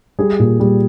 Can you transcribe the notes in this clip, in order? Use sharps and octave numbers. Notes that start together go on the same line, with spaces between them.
G3 G#4
A#2
G3